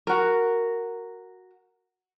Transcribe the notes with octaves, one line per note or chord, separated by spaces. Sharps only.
F#4 A#4